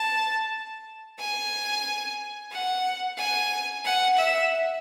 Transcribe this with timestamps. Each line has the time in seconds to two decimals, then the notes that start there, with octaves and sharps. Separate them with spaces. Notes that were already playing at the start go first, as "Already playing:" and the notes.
Already playing: A5
1.19 G#5
2.52 F#5
3.18 G#5
3.85 F#5
4.17 E5